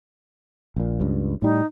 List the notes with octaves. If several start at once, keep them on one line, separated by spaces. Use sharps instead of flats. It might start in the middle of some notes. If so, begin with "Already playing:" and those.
A#1 A#2
C#2 G2
A2 G3 D#4